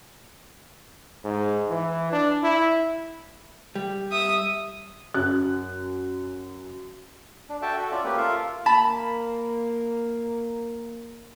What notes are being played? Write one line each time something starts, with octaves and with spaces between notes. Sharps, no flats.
G#2
E3
D4
E4
G3
E5 D#6
F#2 F#6
D4
F#4 A4 E5 G5 A5
F#4 A4
C#4 F4 D5 E5
A3 A#3 C#4 G4 B4
F4 A4 A#4 E5 F5
A#3 A5 B5